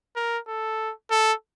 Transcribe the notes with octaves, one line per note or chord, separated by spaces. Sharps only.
A#4
A4
A4